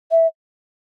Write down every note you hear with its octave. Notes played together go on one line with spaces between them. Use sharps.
E5